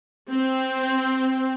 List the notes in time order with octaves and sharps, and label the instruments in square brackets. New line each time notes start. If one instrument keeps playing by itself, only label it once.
[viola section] C4